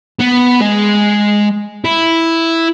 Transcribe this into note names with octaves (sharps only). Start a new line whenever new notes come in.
B3
G#3
E4